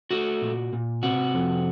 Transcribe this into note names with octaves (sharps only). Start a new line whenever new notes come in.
A3 F#4
A#2
A#2
C3 F#4
F2